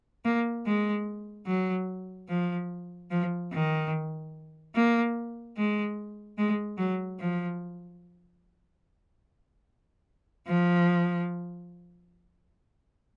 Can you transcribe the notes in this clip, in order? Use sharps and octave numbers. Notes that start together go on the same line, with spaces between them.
A#3
G#3
F#3
F3
F3
D#3
A#3
G#3
G#3
F#3
F3
F3